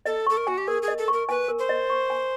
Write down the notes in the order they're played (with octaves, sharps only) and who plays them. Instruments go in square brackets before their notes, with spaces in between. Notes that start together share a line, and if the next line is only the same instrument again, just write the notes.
[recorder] A4 [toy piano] D#5
[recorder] A4 [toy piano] C#6
[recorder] A#4
[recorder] F#4 [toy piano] G#5
[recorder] G4
[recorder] G#4 [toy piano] A#4
[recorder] G#4
[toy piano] D#5
[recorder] A4
[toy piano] C#6
[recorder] A#4
[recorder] B4 [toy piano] G#5
[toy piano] A#4
[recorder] C5
[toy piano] D#5
C#6
G#5